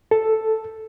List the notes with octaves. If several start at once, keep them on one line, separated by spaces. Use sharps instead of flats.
A4